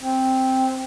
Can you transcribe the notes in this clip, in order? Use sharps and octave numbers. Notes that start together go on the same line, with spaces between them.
C4